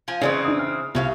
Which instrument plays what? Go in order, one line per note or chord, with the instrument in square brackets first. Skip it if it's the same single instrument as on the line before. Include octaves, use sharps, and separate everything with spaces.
[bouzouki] F3 G#5
[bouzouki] C#3 E3 C4 [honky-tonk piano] C#4 D5 D#5
[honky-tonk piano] D4 D#6
F6
[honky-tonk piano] C2 [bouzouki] C4 C#4 F5